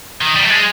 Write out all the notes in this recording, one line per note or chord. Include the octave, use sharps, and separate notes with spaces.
D#3
G3
A3
G#3